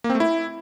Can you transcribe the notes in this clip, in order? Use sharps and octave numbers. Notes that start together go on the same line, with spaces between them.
A#3
C4
A3
E4